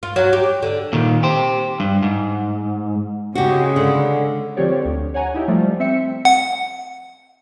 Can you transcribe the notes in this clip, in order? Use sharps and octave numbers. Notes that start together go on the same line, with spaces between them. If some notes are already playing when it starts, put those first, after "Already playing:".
F4
F#3
G4
D3
A#2 D#3
G4 C5
G2
G#2
C#3 G#3 F#4 G4
D3
D3 F3 C4 G4 C#5 D5
D2
C#5 F#5 G#5 A#5
D#4 E4 G4
F3 G3 A3
C4 E5 C#7
F#5